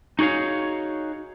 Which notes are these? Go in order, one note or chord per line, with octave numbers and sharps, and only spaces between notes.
D#4 F#4 G#4 C#5 F5